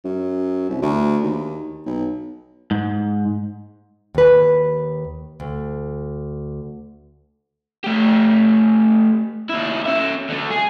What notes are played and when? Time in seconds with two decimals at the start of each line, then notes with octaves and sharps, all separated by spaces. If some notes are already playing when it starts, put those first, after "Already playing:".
0.05 F#2
0.70 C2
0.82 D2
1.23 D#2
1.86 B1
2.71 G#2
4.15 D#2 B4
5.40 D2
7.84 A3 G4
9.49 D#2 E4
9.86 C#4 E5
10.29 D3 A3
10.50 G#4